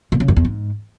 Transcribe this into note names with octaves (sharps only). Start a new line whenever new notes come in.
A#2
C#3
F#2
E2
G#2